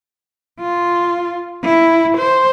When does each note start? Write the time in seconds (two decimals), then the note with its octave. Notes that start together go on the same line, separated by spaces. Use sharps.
0.60 F4
1.64 E4
2.18 C5